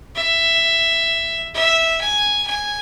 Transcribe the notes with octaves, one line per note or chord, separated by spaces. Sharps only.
E5
E5
G#5
G#5